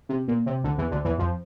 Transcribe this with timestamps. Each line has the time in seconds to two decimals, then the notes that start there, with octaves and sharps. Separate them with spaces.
0.09 C3
0.28 A#2
0.46 C3
0.64 D2 D3
0.78 E2 E3
0.91 D2 D3
1.05 E2 E3
1.18 F2 F3